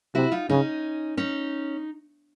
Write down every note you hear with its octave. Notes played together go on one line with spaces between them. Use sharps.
C3 E4 F#4
D#4 F4
C#3 C#4 D#4
C#4 D#4